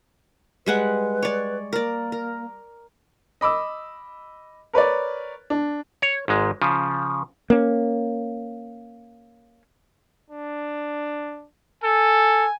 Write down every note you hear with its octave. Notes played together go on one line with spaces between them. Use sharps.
G3 G#3 B4 F#5
C#5 D5
A#3 A#4 D5
A#4
D#5 B5 D6 E6
A#4 B4 C#5 D5
D4
C#5
G#1 G#2 G#3
C#3 F3
A#3 C#4
D4
A4 G#5